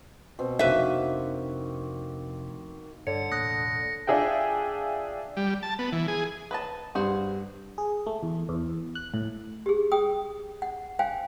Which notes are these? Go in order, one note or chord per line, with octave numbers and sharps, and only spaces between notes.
B2 C4
F1 D#3 A#3 D4 F#4 B4 E5
G2 D3 C#5 C#7
E1 A2 A#3 D#6 F#6 A#6
D4 F4 G#4 E5 G5
G3
A5
B3
E3
G#4
B4 D#5 A5
G2 F#4 G#4 C5
G#4
A3
E2
E2
F#6
A2
G4 G#4
G#4 G5 D#6
F#5
C5 F5 G5 G#5